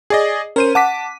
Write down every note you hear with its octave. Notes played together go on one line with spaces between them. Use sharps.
G#4 D5 D#5
C#4 A#4 C5 D#7
F#5 A5 D6 B6